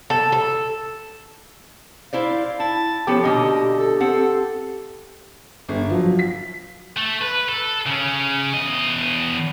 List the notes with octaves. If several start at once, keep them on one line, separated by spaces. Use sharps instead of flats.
A4
A4
E4 C5 D5 F5
E4 A5
F3 B3 C#4 G4 A4
B2 D3 A#3 D#5
A4
C4 A4 F#5
G1
F3 F#3
B6
A3
B4
A4
C#3 C#4
E2 D#5